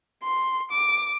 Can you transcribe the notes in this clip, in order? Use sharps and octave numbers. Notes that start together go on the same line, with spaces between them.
C6
D6